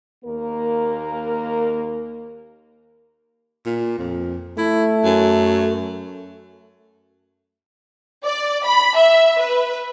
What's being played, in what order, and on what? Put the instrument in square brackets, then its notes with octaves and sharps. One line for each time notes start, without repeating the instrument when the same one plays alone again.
[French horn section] D#2 A#3 A#4
[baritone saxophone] A#2
F2
[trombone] A3 [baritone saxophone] E4
[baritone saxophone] F#2
[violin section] D5
B5
E5
B4